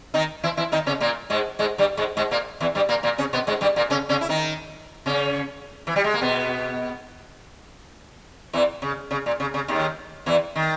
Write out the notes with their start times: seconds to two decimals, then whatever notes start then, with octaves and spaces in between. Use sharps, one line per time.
0.14 D#3 D#4
0.43 E3 E4
0.57 E3 E4
0.72 D#3 D#4
0.86 C#3 C#4
1.00 A#2 A#3
1.30 G#2 G#3
1.59 G#2 G#3
1.78 G2 G3
1.97 G#2 G#3
2.17 G#2 G#3
2.31 A#2 A#3
2.60 E2 E3
2.75 G2 G3
2.89 A#2 A#3
3.03 A#2 A#3
3.18 C#3 C#4
3.33 B2 B3
3.47 G#2 G#3
3.61 G2 G3
3.76 A#2 A#3
3.90 C#3 C#4
4.09 C#3 C#4
4.21 E4
4.29 D#3 D#4
5.06 C#3 C#4
5.87 E3
5.96 G3
6.04 G#3
6.14 A#3
6.21 B2 B3
8.53 E2 E3
8.82 C#3
9.11 C#3
9.26 A#2
9.40 C#3
9.54 C#3
9.68 D#2 D#3
10.26 E2 E3
10.56 D#3